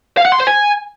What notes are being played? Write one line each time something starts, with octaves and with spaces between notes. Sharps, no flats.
F5
F#5
C6
C5
G#5